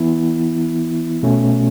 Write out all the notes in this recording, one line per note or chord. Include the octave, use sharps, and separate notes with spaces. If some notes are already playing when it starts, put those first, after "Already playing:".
Already playing: E3 B3 E4
B2 A3 C#4